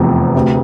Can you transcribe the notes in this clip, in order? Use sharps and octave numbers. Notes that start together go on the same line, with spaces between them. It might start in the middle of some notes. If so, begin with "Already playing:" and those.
Already playing: F1 E2 C3 F3
D2 C3